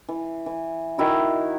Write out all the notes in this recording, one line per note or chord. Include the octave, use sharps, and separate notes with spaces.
E3
E3
D#3 E4 F#4